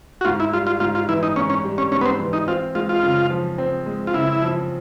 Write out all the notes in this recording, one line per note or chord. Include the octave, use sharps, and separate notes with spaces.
F#4
G#2 F4
E4
G3 F4
F4
G#2 F4
F4
E3 E4
D#4
G#2 C#4
C#4
G3
C#4
G#2 C#4
B3
C4
E3
D#4
C4 F4
G#3 F4
F4
C#3
F3
C4
G#3
F4
C#3 E4
F3